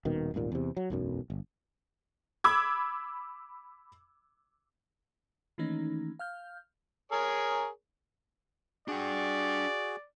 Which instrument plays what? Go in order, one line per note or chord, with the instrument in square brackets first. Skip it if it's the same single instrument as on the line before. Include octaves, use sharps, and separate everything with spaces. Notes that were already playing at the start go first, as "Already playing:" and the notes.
[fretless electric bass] D#1 B2 D#3
D#1 G#1 D#2 A#2
E2 C3
F#3
E1 B1 F#2
G1
[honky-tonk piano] B5 D6 E6 G#6
[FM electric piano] D#3 E3 A3 A#3 C#4 D#4
F5 F6 G6
[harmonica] G#4 A#4 C#5
[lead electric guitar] D4 G5 [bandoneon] F#4 G#4 [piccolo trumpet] D5